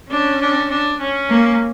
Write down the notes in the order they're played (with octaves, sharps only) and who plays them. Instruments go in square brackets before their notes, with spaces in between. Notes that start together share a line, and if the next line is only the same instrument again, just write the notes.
[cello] C#4 [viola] D4
[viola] D4
D4
C#4
[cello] A#3